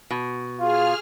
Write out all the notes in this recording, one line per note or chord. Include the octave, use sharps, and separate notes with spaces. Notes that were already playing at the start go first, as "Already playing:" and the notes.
B2
F4 G#4 F5 F6